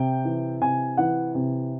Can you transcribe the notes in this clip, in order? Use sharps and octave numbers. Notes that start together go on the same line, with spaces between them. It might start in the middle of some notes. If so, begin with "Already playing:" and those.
Already playing: C3 G5
E3
C3 G#5
E3 F#5
C3